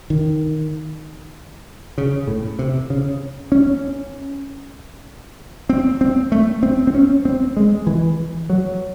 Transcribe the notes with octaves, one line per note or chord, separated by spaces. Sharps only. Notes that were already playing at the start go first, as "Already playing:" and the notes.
D#3
C#3
A2
C3
C#3
C#4
C4
C4
A3
C4
C4
C#4
C4
G#3
E3
F#3